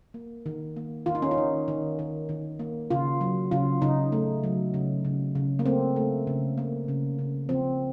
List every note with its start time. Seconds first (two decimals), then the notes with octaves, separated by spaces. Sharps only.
0.14 A#3
0.46 D#3
0.76 A#3
1.06 D#3 F4
1.15 D#4
1.22 C#4
1.31 D#4
1.38 D#3
1.68 D#3
1.99 D#3
2.29 D#3
2.59 A#3
2.90 C#3 F4
3.21 F#3
3.51 C#3 F4
3.81 C#3 D#4
4.12 A3
4.44 F#3
4.74 C#3
5.05 C#3
5.35 C#3
5.59 A#3
5.66 A3 C4
5.96 A3
6.27 C#3
6.58 A#3
6.88 C#3
7.19 C#3
7.49 F3 C4